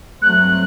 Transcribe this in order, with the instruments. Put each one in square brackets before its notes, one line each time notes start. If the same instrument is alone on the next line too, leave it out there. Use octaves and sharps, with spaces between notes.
[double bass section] G2 F#3 A3 C4 [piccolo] F#6